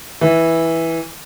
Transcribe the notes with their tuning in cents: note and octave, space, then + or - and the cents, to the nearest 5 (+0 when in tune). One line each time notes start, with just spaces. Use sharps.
E3 -5